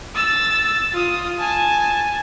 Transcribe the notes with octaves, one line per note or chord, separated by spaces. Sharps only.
E6 A6
F4 D#6
G#5 A5